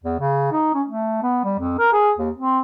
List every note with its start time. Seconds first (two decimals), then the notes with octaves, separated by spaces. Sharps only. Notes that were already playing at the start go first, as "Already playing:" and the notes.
0.04 E2
0.20 C#3
0.52 D#4
0.74 C#4
0.88 A3
1.22 B3
1.44 G3
1.59 F2
1.79 A#4
1.92 G#4
2.18 D#2
2.38 C4